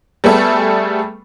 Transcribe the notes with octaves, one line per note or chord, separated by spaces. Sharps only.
G3 A3 B3 G#4 A4